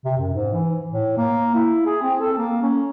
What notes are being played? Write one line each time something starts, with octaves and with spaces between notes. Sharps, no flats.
C3
F#2
G#2
E3
A2
A#3
E4
G#4
C4
A4
A#3
C#4